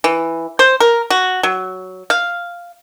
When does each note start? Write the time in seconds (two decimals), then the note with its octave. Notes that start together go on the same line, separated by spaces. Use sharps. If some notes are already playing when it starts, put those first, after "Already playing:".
0.04 E3
0.59 C5
0.80 A#4
1.10 F#4
1.43 F#3
2.10 F5